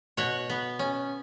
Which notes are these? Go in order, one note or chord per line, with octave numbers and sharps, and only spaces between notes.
B2 C#5 F#5
B3
C#4